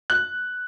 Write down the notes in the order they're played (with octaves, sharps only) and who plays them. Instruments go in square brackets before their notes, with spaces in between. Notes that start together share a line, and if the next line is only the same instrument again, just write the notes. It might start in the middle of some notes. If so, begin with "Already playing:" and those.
[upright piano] F#6